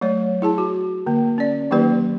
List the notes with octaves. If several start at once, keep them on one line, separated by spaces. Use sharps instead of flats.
F#3 A3 C#5
E4 G#4 A5
F#4
D3 A#3
C#4 D5
D#3 F#3 A#3 D#4 G4 B4